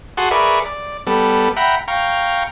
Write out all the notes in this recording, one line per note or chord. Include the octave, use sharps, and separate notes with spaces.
F#4 G#4 F#5 A5 C6
G#4 A#4 B4 D5 E5 C#6
D5
G3 B3 A4
E5 F#5 G5 A#5 B5
F5 G5 A#5 C#6